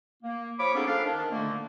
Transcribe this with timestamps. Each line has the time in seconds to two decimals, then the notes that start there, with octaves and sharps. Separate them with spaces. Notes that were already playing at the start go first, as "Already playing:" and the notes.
0.23 A#3
0.59 F3 C#5 B5 D6
0.75 A#3 B3 C#4 D#4 G#4 A4
0.87 F3 D4 A4 F5
1.05 D#3 D4
1.31 A#2 D3 A3 A#3